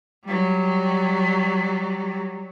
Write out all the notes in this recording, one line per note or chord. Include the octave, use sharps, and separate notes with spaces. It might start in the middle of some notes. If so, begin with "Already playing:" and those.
F#3 G3